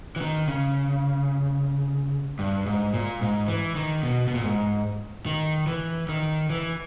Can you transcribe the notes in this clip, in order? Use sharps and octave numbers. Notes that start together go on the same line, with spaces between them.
E3
D#3
C#3
G2
G#2
A#2
G#2
E3
D#3
B2
B2
A#2
G#2
D#3
E3
D#3
E3